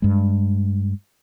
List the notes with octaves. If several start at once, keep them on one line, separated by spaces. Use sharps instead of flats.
G2 G#3